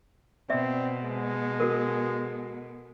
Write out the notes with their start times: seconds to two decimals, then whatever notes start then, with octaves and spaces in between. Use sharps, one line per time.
0.50 B2 C4 D5 E5
1.04 G#3
1.60 F#4 A4 A#4